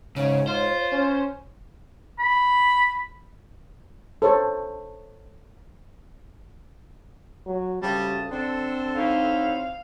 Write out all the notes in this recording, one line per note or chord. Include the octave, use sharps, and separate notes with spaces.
G#2 C#3 C#5
F4 C5
C#4
B5
A4 C5 C#5
F#3
D2 C#3 G3 A5 D#6
D3 C4 D4 A4
F#3 D#4 E4 F5